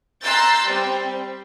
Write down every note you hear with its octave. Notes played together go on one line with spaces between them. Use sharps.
A#5 C6 E6 F#6 G6 A6
G3 C4